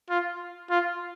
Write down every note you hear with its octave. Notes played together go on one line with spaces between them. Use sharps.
F4
F4